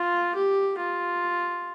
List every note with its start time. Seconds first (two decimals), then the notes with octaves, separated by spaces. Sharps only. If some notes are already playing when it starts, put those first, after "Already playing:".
Already playing: F4
0.35 G4
0.78 F4